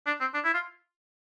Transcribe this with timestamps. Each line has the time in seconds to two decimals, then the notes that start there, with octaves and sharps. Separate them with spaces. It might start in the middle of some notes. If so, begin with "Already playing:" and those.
0.07 D4
0.21 C4
0.34 D4
0.44 E4
0.54 F4